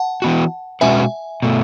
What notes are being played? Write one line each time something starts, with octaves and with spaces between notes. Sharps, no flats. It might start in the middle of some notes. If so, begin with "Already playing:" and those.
Already playing: F#5 A5
E3 B3 F#4
B2 G#3 C#4 F#4 B4 E5 G#5
B2 A3